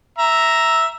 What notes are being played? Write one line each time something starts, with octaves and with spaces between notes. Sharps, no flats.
E5 A#5